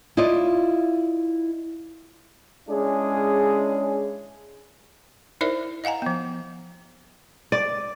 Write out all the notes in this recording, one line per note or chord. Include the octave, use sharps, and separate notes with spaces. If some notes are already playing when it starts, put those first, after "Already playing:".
E4 F4 D5 D#5
G#3 C#4 D4 E4 G#4
D#4 E4 A#4 C5 D5 E5
D#5 F5 F#5 G#5 A#5
F3 B3
D5